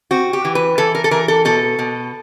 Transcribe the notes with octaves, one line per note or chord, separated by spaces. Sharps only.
C4 F#4
G4
E3
B4
E3 A4
A#4
A4
E3 A#4
A4
B2 A4
B2